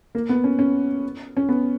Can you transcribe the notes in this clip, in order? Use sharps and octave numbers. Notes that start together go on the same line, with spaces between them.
A#3
B3
C#4
C#4
C#4
B3